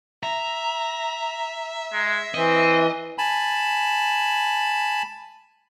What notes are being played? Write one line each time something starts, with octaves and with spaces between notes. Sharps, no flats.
E5 A#5
G#3
E3 C4 D#5
G#5 A5 B5